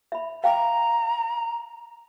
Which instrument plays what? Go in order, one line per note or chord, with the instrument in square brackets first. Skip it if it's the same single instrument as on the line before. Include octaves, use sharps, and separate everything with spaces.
[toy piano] E5 B5
[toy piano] F5 G5 D6 [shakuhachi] A#5